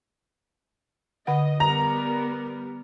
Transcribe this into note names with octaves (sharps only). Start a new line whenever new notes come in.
D3 D#5 F#5
G3 B3 A#4 A#5